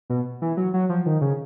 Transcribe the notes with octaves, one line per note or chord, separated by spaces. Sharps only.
B2
E3
F#3
F#3
F3
D#3
C#3